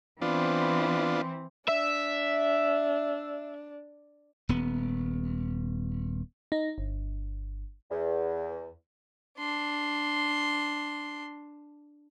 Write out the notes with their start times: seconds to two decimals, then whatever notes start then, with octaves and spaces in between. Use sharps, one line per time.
0.22 E3 B3 C4 D4 F4
1.68 D4 E5
4.49 D#1 B3
6.52 D#4
6.78 G1
7.91 E2
9.38 D4 C6